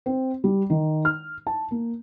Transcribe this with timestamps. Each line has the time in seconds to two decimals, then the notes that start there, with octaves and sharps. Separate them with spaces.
0.06 C4
0.44 G3
0.70 D#3
1.05 F6
1.47 A5
1.71 A#3